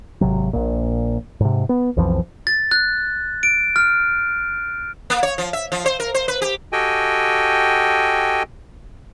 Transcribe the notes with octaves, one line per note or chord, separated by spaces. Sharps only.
G#1 C3 F#3
A#1 A#2
G#2 C3
B3
B1 F2 E3 F3
A6
F#6
D7
F6
A#3
C#5
F3
E5
F3
C5
A#4
C5
B4
G4
F#4 G4 A4 D#5 G5 G#5